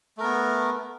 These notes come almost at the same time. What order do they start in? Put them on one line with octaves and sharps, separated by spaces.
A3 A#4 B3